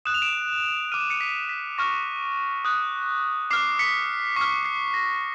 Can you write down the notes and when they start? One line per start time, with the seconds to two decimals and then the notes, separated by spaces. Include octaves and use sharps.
0.05 D#6 F#6 E7
0.14 F7
0.22 D7 E7
0.92 D6 F6 D#7
1.01 E7
1.10 C#7 D#7
1.21 B6
1.49 B6
1.78 C#6 F6 A#6
2.64 D#6 F#6
3.51 D6 F6 C7
3.79 B6 C#7
4.36 C#6 F6 B6
4.65 C7
4.94 A#6